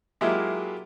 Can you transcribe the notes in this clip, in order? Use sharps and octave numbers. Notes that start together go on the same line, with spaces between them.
F#3 G#3 A#3 E4 F4 G4